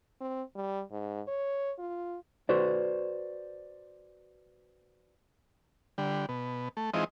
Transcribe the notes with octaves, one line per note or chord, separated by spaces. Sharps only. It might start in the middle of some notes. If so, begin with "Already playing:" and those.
C4
G3
G#2
C#5
F4
F#4 B4 C5 D5
D3 G3
B2
A3
E3 G#3 C4 D#4 F4 D#5